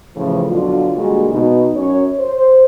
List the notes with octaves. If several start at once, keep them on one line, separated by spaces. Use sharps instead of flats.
A2 C#3 E3 F3
B2 D3 F#3 F4
A#2 D3 G3 G#3 F#4
B2 D#4
F#2 C#5
C5